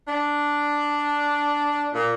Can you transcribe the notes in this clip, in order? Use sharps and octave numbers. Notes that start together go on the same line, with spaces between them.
D4
A#2